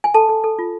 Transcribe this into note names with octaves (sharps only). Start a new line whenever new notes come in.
G#5
A4 A5
A4
A4
F4